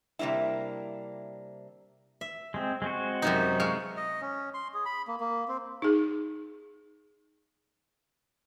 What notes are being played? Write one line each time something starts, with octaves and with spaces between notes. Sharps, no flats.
C3 G3 A#3 D4 E4
E5
G#3 C4
G#3 C4 F#4
F#2 C3 D#4
G#3 F5 C#6
D#5
C#4
C6
G#4
B5
A#3
A#3
C4
D#4 G#4